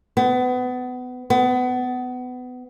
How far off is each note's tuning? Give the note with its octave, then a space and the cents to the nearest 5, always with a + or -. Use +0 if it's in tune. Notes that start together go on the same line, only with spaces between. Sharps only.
B3 +25
B3 +25